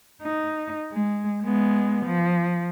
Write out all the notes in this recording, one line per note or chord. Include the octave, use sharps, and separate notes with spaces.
D#4
G#3
G#3 B3
F3